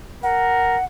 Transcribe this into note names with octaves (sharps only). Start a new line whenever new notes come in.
A#4 F#5